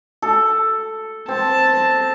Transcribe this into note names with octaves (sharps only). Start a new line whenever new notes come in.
A4
C4 A5